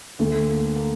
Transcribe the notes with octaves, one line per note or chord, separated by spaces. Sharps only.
D2 A3
A#3
A#3